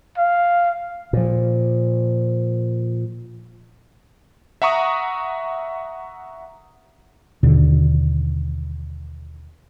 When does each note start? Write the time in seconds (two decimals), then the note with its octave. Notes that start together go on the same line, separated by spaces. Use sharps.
0.18 F5
1.13 A#2 F3
4.62 E5 F#5 A#5 C#6 D#6
7.43 D#2 B2 D3